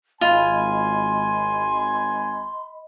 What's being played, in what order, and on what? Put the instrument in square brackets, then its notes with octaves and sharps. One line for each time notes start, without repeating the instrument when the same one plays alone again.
[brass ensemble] G#1 G#5 [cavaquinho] F4 [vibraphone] D#5 B5 [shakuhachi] C6